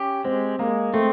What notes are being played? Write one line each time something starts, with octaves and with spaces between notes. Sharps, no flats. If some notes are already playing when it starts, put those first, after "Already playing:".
Already playing: C#4 G4
G#3 C4
G#3 A#3
A3 C4